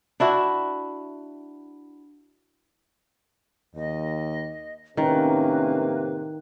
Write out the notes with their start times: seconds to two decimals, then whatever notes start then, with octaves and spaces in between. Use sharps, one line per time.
0.20 D4 E4 F#4 E5
3.75 D#2 D#5
4.97 A2 C3 D#3 A#3 C#4 B4